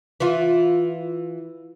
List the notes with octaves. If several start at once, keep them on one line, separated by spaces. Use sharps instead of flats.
E3 F4